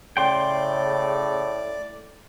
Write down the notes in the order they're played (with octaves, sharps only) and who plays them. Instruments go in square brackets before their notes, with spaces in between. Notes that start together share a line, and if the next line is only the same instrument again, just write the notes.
[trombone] A2 [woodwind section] C#3 [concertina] D5 [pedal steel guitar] G5 C6